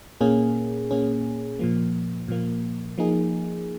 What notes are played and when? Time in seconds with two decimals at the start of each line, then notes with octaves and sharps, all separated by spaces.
0.21 A#2 A#3 C#4 G#4
0.91 A#2 A#3 C#4 G#4
1.59 A#2 F3 A#3
2.28 A#2 F3 A#3
2.98 F3 A#3 D#4 G#4